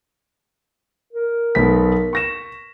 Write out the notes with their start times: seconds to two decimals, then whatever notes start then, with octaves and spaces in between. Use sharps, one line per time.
1.13 A#4
1.55 B1 B3 B6
2.13 C#6 A#6 E7